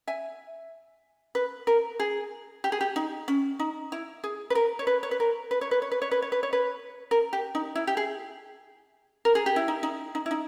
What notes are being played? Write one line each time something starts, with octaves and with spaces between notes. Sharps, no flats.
E5 G#5
B4
A#4
G#4
G4
G#4
G4
D#4
C#4
D#4
E4
G#4
B4
A#4
C#5
B4
C#5
B4
A#4
B4
C#5
B4
C#5
B4
C#5
B4
C#5
B4
C#5
B4
A#4
G4
D#4
E4
G4
G#4
A#4
G#4
G4
E4
D#4
D#4
D#4
E4
D#4